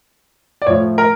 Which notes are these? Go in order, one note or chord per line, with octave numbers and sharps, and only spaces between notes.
D5
A2 F3 A3 C#5
A#4